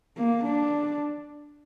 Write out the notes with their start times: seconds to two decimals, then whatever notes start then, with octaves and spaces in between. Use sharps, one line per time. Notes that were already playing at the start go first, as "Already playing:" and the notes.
0.17 A#3
0.45 D4